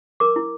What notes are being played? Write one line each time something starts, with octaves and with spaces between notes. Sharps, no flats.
A#4 D6
E4